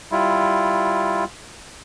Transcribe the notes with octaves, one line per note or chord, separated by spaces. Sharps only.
G3 E4 F4